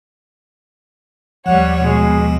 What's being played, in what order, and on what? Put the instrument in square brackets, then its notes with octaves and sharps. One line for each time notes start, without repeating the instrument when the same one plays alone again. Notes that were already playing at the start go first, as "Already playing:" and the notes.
[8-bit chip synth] D#2 F3 [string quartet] G3 C#5 [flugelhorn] F#5
[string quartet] B2 [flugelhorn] G#3